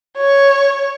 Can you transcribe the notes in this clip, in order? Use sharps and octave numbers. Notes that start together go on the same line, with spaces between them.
C#5